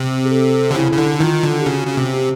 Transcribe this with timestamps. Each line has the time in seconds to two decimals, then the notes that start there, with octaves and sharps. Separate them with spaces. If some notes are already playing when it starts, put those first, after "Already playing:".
Already playing: C3
0.23 G#4
0.29 A4
0.71 D3
0.74 C#3 E4
0.92 C#3
0.98 D3
1.20 D#3 F4
1.43 D3
1.59 G4
1.66 C#3 F#4
1.87 C#3
1.97 C3
2.12 G4